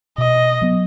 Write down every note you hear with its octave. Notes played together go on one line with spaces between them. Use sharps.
B2 D#5
F#3 B3